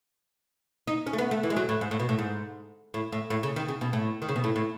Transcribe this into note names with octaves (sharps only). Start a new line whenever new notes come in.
D#4
C#4
A3
B3
A3
E3
G#3
F#3
A2
G#2
A2
B2
A2
G#2
A2
A2
A2
C#3
D#3
C#3
B2
A2
D#3
C#3
B2
A2
A2